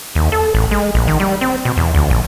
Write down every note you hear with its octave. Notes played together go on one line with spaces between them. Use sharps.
D#2
A4
A1
G#3
A#1
D#3
G3
C4
B2
E2
D2
A#1